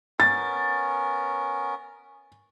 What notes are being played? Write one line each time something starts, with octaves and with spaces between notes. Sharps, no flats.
B3 C#4 A#4 A6